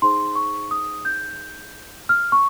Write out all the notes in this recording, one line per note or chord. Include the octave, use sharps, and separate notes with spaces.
D#4 G#4 C5 C6
C#6
D#6
G6
F6
C#6